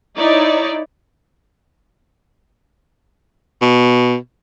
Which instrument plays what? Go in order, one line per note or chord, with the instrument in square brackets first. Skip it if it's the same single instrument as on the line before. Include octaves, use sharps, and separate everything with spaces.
[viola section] D#4 E4 C#5 D5
[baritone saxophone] B2